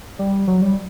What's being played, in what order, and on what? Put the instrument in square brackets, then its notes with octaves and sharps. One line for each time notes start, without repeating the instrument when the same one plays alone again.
[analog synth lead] G3
F#3
G3